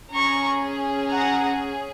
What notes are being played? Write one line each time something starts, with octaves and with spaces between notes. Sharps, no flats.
C#4 G#4 A#5 C#6
F#5 A#5